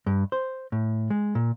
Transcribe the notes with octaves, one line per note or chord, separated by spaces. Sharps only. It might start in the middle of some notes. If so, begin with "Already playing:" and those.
G2
C5
A2
G#3
A#2